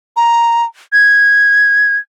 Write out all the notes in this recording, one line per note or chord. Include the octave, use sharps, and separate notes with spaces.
A#5
G#6